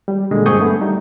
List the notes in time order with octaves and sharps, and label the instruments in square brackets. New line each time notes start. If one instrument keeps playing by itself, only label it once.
[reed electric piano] G3
A#2 D3 G#3
G2 C4 G#4 C#6 D#6 G6
A3 B3
G3 D#4